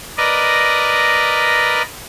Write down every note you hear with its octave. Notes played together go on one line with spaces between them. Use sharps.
A#4 B4 D5 D#5